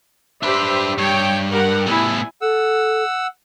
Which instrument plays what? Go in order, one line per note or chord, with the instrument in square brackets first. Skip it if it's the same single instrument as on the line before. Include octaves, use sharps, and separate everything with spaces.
[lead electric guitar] D4 B4 [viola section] G4 C5 E5
[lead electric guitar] G2 [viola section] C#5 G5
[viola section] G3 A#4 F#5
[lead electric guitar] A2 B3 [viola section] E4 G#5
[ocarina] A4 [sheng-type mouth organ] F#5 E6